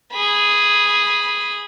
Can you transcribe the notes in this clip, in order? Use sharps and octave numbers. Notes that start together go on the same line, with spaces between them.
G#4 B5